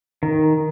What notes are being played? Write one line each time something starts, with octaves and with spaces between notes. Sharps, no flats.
D#3